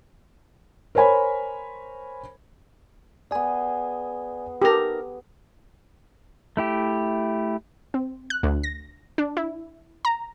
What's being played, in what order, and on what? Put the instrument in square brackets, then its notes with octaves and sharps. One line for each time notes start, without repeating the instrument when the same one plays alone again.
[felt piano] A#4 C5 C#5 G#5 B5
[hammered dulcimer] B3 G#4 [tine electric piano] D5 G#5
[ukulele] D#4 A#4 [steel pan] G4 A4
[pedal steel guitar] A3 E4 G4
[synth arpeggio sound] C4
F#6
D2
A#6
D4
E4
A#5